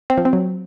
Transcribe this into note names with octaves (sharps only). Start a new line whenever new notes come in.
C4
F3
C4
F#3